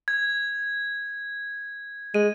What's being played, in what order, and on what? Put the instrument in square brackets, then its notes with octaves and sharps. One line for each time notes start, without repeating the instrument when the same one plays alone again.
[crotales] G#6
[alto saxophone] G#3 [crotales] D#7